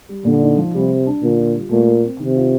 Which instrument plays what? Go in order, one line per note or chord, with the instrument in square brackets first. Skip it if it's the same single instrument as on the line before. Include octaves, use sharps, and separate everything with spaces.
[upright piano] G3
[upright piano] A#2 [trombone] D3
[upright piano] D#4
F3
[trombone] C3 [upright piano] G3
[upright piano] G3
D4
[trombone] A#2 [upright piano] D3
[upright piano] F4
G3
[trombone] A#2 [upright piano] A3
[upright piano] A#4
C4
[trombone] C3 [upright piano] D#3
[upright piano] F4